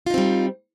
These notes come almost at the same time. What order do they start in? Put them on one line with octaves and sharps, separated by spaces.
F4 D#4 C4 G3